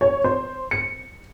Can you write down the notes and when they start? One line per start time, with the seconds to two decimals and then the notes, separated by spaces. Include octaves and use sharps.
0.01 C#5
0.24 C5
0.71 C#7